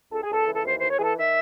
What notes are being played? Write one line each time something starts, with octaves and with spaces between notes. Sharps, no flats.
C#2 A4
G#4
C#2 A4
E3
A4
D#2 C5
D#2 C5
C#5
E3 G#4 A4
D#3 E5